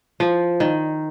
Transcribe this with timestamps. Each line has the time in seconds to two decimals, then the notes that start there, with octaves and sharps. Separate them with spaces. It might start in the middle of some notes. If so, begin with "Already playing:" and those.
0.20 F3
0.60 D#3